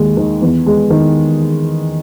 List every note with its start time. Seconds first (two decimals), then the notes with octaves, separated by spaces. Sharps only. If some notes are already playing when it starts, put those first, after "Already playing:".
Already playing: D#2 G#3
0.17 D#3
0.41 E2
0.66 G#3
0.90 D#3